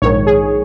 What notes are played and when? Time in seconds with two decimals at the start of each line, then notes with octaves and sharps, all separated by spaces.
0.02 A#1 G#2 D#3 C#5
0.27 G#4